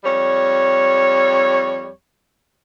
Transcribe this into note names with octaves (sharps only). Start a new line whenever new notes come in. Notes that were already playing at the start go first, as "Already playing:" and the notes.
F2 G3 C#5